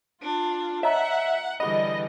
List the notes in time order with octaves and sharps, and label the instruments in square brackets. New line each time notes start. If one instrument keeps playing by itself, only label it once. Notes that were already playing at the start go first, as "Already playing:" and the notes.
[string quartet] D4 F4
[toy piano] C#5 D#5 A#5 [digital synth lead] E5 [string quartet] F#5
[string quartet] D3 E3 G3 [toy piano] G#4 B5 [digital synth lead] D#5